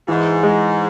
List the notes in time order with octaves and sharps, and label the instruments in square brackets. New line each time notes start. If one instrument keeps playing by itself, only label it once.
[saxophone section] G#2 [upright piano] E3
[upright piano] G#3